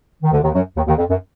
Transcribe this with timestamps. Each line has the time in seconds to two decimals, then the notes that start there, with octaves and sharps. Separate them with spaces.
0.22 D#3
0.31 D2 D3
0.42 D#2 D#3
0.54 F#2 F#3
0.76 D#2 D#3
0.87 D#2 D#3
0.97 F2
1.10 F#2